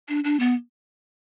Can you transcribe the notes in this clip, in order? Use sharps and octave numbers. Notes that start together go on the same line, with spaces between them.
D4
D4
B3